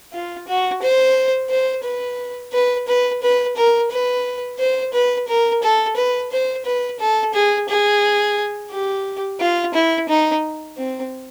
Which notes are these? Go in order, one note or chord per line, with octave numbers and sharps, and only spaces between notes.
F4
F#4
C5
C5
B4
B4
B4
B4
A#4
B4
C5
B4
A#4
A4
B4
C5
B4
A4
G#4
G#4
G4
F4
E4
D#4
C4